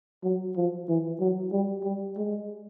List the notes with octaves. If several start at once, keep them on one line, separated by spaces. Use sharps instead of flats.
F#3
F3
E3
F#3
G3
G3
G#3